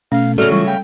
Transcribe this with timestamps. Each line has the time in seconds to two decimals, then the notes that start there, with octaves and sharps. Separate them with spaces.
0.12 B2 A3 C#4 F5
0.38 C#3 F#3 A3 F#4 A4 D5 F6
0.52 E3 G3 G#3 F4 C#6
0.67 F5 G5 B5